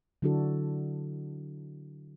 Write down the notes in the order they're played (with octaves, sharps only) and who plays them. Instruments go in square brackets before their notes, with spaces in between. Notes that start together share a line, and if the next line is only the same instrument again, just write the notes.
[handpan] D3 F#3 D4 E4 F#4 A4